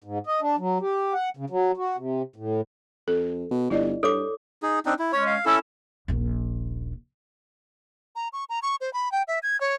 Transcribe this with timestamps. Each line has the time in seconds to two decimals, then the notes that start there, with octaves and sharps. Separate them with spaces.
0.04 G#2
0.27 D#5
0.41 D4
0.58 F#3
0.81 G4
1.14 F#5
1.37 C#3
1.50 F#3
1.77 F#4
1.97 C3
2.36 A2
3.08 F2 A4
3.51 B2
3.70 G1 E4 D5 D#5
4.03 G2 A4 C#5 D6
4.63 D#4 G#4
4.86 C4 D4 D#4
4.99 E4
5.13 G#3 C#4 C#5
5.27 F5
5.46 C#4 E4 A4 E6
6.08 D#1 A#1
8.16 A#5
8.33 C#6
8.49 A#5
8.62 C#6
8.81 C5
8.93 B5
9.12 G5
9.28 E5
9.43 G#6
9.61 C#5